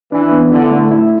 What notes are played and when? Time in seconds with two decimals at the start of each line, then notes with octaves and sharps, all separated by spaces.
0.12 E3 D4
0.32 B3
0.52 D3 E4
0.71 A3
0.91 E4